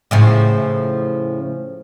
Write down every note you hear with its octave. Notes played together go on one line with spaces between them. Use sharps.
A2 C#3 F3